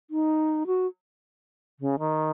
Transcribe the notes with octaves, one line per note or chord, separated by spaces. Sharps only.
D#4
F#4
C#3
D#3